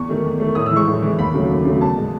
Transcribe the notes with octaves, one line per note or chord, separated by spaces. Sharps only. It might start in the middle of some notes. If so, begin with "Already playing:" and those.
Already playing: E2 C#6
D#3 A3
E2
D#3 A3
A2 D#6
E6
E3 G#3 C#6
A2
E3 G#3
D#2 B5
C#3 F#3 A3
D#2
C#3 F#3 A3
E2 A5
B2 G#3